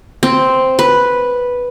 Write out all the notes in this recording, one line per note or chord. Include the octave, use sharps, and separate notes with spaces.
C4
B4